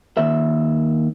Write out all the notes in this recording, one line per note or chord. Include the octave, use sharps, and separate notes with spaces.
D#2 E5